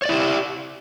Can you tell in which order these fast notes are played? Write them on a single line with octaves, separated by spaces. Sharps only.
C#5 D5 E4 G4